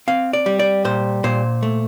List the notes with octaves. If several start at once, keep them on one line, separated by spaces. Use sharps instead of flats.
C4 F5
D5
G3
D5
A#2 C5
A#2 C5
A3